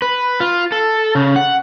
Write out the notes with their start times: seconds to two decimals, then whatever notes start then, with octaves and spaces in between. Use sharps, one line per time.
0.02 B4
0.40 F4
0.72 A4
1.15 C#3
1.36 F#5